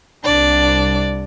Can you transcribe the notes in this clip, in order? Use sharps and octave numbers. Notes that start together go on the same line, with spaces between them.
C2 D4 D5